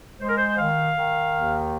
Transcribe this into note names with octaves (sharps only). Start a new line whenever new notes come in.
G#3 C5
A#4
C5
D#3 F5
D#3
D#2